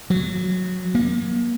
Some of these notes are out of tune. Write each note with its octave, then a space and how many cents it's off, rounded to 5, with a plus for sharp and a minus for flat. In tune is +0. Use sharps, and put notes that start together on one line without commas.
F#3 -15
A#3 +30